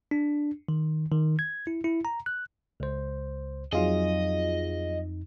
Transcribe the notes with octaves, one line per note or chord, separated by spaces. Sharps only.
D4
D#3
D#3
G#6
E4
E4
A#5
F#6
C#2 C5
F2 F#3 D#4 F4 G#4 D#5